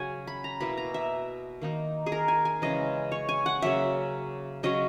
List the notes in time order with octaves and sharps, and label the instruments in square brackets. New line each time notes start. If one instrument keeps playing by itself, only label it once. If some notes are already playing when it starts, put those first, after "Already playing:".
Already playing: [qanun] C#3 F#3 C#4 F#5 G#5
B5
A#5
B2 A#3 E4 B5
A#5
E5
D#3 A#3 D#4
G#4
A#4
G#5
G#5
C#3 E3 G#3 D#5
C#5
G#5
F#5
C#3 F#3 A#3 E5
C#3 F#3 C#4 D#5